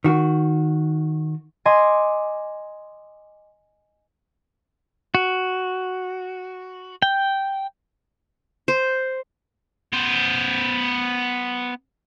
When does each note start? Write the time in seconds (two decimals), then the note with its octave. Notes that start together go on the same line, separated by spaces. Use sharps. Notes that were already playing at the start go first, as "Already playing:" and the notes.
0.04 D#3 F#4
1.65 D#5 G#5 C6 D6
5.15 F#4
7.02 G5
8.68 C5
9.93 B3 C5